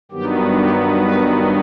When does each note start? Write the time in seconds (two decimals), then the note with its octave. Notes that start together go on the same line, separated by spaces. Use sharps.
0.11 G2 D#3 F#3 B3 G4
0.57 G4
1.02 B4